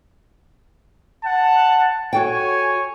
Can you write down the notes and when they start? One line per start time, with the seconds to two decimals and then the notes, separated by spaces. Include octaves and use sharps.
1.24 F#5 A5
2.13 F#4 A4 C#5 G5 G#5